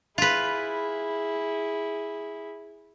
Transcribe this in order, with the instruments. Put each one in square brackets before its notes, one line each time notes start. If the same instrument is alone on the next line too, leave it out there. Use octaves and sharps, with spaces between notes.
[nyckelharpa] E4 G#4 [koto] F4 B4